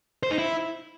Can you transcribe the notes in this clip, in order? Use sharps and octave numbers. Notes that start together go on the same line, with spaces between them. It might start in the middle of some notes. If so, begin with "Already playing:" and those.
C5
D#4
E4